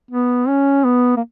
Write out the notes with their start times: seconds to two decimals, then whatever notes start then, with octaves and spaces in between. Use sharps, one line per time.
0.11 B3
0.48 C#4
0.84 B3
1.17 A#3